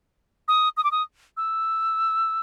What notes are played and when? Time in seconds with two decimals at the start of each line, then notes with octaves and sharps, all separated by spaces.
0.48 D#6
0.77 D#6
0.84 D6
0.92 D#6
1.37 E6